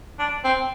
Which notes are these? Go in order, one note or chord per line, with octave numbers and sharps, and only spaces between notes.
D4
C4